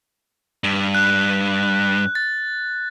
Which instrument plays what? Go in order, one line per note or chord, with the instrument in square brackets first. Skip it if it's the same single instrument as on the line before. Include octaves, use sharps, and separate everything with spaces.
[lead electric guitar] G2
[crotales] F#6
A6